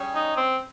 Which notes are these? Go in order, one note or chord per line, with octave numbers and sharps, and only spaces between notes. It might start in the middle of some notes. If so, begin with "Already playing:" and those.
Already playing: G3 C#4 G#4 C#5
D#4
C4